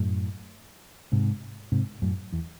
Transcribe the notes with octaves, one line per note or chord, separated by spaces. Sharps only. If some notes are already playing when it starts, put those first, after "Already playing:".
Already playing: F#2 A2
G#2 C3
G#2 C3
F#2 A2
E2